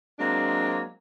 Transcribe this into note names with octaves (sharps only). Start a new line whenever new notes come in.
F#3 G#3 A#3 C4 D4